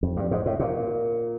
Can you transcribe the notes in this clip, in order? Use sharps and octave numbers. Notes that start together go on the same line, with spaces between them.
F2
G2
G#2
A2
A#2